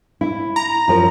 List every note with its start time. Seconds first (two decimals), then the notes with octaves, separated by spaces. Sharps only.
0.21 E4
0.56 A#5
0.88 F#2 F3 A#4